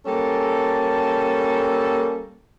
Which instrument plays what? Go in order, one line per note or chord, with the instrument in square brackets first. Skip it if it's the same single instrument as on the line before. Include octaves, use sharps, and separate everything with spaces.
[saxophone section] G3 A#3 C#4 A4